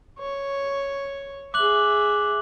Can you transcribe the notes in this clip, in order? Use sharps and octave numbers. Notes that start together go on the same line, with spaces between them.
C#5
G#4 E5 D6 F#6 F#7